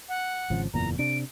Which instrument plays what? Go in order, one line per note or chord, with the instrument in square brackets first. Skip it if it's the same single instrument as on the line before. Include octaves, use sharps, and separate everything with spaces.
[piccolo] F#5
[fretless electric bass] G#1 C#3 F3
[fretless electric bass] F#1 E2 A#2 [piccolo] A#5
[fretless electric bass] C3 D4 [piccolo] D7